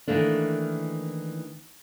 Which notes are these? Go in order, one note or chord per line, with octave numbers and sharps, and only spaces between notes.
D#3 E3 A3 A#3 D4